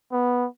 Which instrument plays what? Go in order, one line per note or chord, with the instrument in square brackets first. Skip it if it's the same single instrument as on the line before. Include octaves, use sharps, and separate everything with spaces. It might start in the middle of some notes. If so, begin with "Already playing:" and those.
[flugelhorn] B3